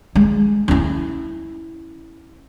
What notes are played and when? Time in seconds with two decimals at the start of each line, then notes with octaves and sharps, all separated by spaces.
0.15 G#3
0.68 C#4 E4